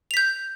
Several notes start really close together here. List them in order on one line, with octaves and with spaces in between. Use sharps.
F7 B6 G6